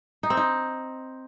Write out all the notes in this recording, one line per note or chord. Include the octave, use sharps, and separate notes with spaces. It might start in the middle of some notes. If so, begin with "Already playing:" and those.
D#4
C4
D#4